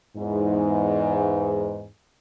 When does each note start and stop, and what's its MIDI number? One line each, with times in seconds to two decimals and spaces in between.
0.18 1.87 40
0.18 1.87 44